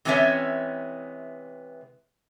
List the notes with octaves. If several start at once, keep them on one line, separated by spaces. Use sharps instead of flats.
C3 E3 G#3 B3 C#4 E5